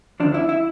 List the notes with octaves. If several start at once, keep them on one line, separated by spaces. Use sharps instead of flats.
D2 D3 F3 D4
E4
E4